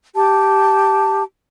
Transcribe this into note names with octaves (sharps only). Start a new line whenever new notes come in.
G4 A5